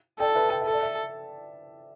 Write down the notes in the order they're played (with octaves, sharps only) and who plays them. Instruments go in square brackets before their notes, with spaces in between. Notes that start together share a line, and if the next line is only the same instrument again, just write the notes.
[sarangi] A4 [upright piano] D5 G5
[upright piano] B4 E5
G5
[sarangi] A4 [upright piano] E5
[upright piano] D5
E5